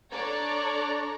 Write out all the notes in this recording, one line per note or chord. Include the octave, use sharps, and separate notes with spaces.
D4 A4 C#5 D5 A#5